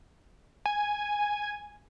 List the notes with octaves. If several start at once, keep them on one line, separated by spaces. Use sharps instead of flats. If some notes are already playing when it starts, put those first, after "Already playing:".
G#5